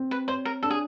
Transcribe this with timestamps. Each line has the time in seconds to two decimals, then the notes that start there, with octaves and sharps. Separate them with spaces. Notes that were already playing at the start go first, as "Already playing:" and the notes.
Already playing: C4
0.11 B4
0.28 C5 C#5
0.45 A#4
0.63 D4 A4
0.70 G#4